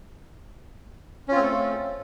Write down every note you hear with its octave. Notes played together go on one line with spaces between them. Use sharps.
A3 C4 C#4 F4 A4